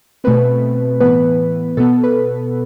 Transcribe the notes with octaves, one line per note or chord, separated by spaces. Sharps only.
B2 A3 C4 B4
A2 E3 B3 B4
B2 B3 A4
B4